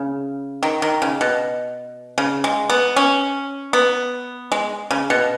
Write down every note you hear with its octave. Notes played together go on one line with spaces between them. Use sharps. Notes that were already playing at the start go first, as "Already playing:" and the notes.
Already playing: C#3
D#3
D#3
C#3
B2
C#3
G#3
B3
C#4
B3
G#3
C#3
B2